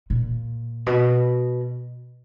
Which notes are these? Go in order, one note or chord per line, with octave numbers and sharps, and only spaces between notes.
A#2
B2